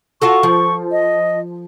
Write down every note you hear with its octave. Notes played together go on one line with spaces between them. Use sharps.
F4 F#4 A4 C#6
F3
D#5